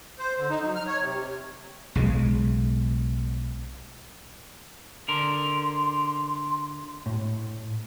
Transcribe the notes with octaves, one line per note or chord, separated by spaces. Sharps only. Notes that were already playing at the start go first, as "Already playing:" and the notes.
C5
D3
D#4
F#3
F6
C#5
C3
B1 C#3 F#3 G#3
D3 A#4 C6
A2